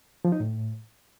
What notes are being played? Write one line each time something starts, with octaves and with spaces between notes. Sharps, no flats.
F3
D#4
A2